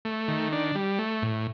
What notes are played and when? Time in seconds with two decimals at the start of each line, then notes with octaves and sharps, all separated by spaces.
0.05 A3
0.28 D#3
0.52 D4
0.75 G3
0.99 A3
1.22 A2